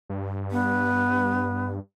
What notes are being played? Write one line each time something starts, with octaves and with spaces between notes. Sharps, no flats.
G2
B3